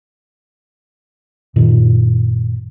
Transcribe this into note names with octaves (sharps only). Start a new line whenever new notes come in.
F#2 A#2 D#3